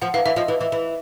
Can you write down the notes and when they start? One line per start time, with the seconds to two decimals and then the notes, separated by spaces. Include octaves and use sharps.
0.02 F3 F#5
0.14 E3 F5
0.26 E3 E5
0.36 F3 D#5
0.48 E3
0.60 E3
0.72 E3